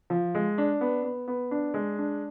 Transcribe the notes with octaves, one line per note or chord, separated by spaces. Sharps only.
F3
G#3
D4
B3
B3
B3
D4
G#3
D4